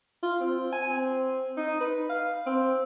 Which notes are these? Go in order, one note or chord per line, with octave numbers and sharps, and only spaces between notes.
F4
C4
G#5
C4
D#4
B4
F5
C4